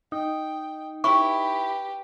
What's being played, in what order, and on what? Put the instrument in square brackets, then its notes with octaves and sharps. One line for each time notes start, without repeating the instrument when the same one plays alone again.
[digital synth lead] D#4 [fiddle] G5
[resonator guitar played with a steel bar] E4 [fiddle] G4 B4 [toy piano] C#6